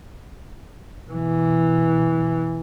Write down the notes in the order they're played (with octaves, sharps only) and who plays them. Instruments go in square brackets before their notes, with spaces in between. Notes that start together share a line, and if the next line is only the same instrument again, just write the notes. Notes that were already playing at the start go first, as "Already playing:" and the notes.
[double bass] B2 E3